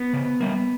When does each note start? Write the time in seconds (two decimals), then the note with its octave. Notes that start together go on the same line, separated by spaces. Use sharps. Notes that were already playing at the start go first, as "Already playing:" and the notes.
Already playing: B3
0.13 C#3
0.41 G3 A#3